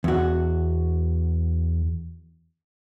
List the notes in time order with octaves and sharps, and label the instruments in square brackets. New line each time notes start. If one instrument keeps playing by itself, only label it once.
[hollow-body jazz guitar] E2 F#4